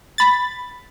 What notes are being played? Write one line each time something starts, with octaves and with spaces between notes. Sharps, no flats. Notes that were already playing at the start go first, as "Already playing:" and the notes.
B5 A6